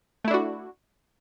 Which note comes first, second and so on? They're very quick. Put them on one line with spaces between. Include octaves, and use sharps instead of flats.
A3 E4 D4 F#4